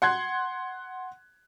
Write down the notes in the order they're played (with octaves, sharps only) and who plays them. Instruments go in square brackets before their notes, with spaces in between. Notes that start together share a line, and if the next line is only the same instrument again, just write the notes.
[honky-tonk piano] F#5 C6 F#6 G#6